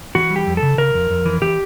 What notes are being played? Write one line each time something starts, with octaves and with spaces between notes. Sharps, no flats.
E3 F#4
G3
G4
F2
A4
C#3
C#3 A#4
F2
F2
E3
E3 G4